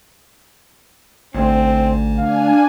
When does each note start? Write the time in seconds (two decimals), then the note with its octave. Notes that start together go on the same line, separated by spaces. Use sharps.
1.34 A1 D2 C4
2.18 D4 F5 G#5